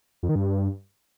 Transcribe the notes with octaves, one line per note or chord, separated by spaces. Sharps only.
F2
D#3
G2